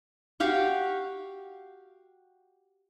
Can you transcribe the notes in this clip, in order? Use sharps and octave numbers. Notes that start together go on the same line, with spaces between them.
F#4 G4 F5 C#6